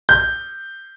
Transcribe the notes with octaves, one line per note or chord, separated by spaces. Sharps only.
G6